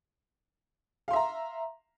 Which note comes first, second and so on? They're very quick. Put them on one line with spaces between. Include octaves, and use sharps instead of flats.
F5 C6 E5 A#5